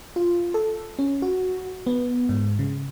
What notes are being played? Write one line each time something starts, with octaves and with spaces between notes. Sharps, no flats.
F4
A4
C#4
F#4
B3
G#2
C#3